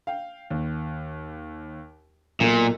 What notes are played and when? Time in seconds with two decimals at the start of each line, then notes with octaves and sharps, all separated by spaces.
0.07 F5 G5
0.51 D#2
2.40 B1 A#2 A#3